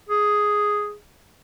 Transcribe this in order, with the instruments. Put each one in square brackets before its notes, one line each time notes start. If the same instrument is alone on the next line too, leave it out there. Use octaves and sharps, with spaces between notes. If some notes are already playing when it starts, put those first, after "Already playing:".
[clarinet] G#4